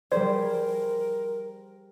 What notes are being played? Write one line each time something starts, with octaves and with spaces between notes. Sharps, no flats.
G3 G#4 A#4 C5 D5